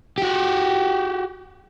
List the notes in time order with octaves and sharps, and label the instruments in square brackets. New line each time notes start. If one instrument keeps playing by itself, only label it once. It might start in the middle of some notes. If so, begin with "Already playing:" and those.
[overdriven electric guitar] F#4 G4